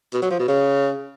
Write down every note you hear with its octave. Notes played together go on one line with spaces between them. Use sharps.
B2
F#3
F3
B2
C#3